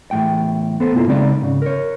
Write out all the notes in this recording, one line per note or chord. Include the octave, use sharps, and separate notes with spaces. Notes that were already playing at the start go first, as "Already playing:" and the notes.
E2 A2 G5
B3 A4 C5
C2 G2 A#3 E4 F4 A4
C#3 G#3 C4 D#4 D5
G#2 C#3
A#4 C#5